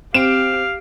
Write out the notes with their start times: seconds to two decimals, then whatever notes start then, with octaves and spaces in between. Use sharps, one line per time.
0.14 C4 G4 F5 D7 E7